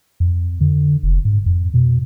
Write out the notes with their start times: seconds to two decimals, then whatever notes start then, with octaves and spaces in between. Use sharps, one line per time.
0.20 F2
0.61 D3
1.03 F1
1.25 G#2
1.46 F2
1.74 B2